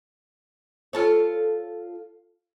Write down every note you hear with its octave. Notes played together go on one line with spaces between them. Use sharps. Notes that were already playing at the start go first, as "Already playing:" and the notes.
F4 A4 C#5